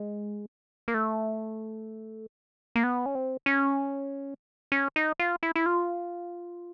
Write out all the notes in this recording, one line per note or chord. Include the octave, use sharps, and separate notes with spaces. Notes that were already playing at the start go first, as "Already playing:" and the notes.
Already playing: G#3
A#3
A3
A#3
B3
C#4
C4
C#4
C#4
D#4
F4
E4
E4
F4